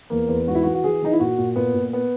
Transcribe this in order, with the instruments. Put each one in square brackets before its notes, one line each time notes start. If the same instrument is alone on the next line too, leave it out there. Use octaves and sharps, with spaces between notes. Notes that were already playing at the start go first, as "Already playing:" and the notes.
[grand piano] E2 A#3
E2
G#2 F#4
E4
F#4
E3
F#4
E3 G#4
E3 D#4
E4
A#2 F#4
A#2
A#2 B3
A#2
B3